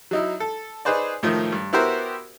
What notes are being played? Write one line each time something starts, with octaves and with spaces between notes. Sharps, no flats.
F#3 D#4 E4
A4
D#4 G#4 B4 C5 D5
A2 D#3 F3 A3
G2
B3 E4 F#4 G4 A#4 C5